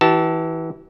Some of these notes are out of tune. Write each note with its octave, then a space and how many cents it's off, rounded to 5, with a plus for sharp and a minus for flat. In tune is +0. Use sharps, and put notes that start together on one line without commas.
E3 -15 G4 -45 A5 +0